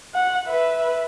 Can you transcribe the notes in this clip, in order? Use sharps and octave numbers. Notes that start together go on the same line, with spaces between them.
F#5
B4 E5